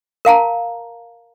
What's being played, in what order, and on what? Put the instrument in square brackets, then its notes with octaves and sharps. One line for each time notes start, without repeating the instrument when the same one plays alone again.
[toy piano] A#4 F5 A5 A#5